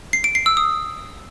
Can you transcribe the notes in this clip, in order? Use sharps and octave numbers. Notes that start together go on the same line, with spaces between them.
C7
D7
C7
E6
D#6